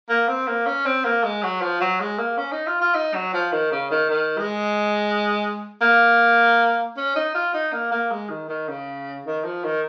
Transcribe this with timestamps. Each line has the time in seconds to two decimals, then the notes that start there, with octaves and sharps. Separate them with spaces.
0.09 A#3
0.28 C4
0.47 A#3
0.66 C#4
0.86 C4
1.05 A#3
1.24 G#3
1.43 F#3
1.62 F3
1.81 F#3
2.00 G#3
2.19 A#3
2.38 C#4
2.52 D#4
2.67 F4
2.81 F4
2.95 D#4
3.14 F#3
3.34 F3
3.53 D#3
3.72 C#3
3.91 D#3
4.09 D#3
4.38 G#3
5.81 A#3
6.97 C#4
7.15 D#4
7.34 F4
7.54 D#4
7.72 A#3
7.92 A#3
8.11 G#3
8.29 D#3
8.49 D#3
8.68 C#3
9.26 D#3
9.44 F3
9.64 D#3